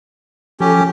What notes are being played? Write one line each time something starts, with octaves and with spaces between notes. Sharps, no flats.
F3 C#4 G4 A4